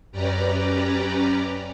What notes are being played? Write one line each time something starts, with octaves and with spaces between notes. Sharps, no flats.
F#2 C#4 G4 B4 D5 A#5